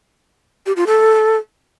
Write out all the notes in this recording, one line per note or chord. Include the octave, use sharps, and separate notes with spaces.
G4
F4
A4